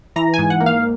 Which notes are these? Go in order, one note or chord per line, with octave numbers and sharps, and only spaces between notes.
E3 A#5
G#5
G#2
F#5
A#3
F5